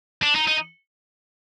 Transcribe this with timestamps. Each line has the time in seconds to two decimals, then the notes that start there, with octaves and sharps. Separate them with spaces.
0.23 D4
0.35 D#4
0.48 D#4